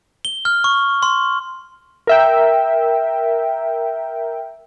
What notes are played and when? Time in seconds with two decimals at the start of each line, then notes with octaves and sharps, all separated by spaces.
0.25 G7
0.45 F6
0.64 C#6
1.02 C6
2.07 A#4 E5 G5